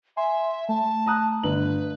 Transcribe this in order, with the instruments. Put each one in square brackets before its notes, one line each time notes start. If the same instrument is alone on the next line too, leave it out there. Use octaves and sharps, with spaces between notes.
[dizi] E5 [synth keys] G#5 C6
[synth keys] A3 [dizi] A5
[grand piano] A#5 D#6 F#6
[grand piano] G1 F#7 [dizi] B4